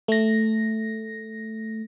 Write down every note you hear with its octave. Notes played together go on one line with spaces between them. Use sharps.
A3 A#6